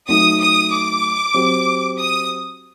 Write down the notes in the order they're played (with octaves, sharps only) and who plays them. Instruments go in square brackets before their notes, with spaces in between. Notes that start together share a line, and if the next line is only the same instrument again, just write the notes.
[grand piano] F#3 A3 D#4 [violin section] D#6
[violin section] D#6
D6
[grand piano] F#3 C4 G4
[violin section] D#6